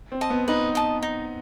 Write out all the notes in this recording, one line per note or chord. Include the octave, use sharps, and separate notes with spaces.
C4
D#5 A5
B3
D#4 B4
D#5 A5
D#4